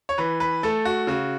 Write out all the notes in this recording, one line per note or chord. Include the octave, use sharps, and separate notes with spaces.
C#5
E3 B4
B4
A3 A4
F#4
C#3 F#4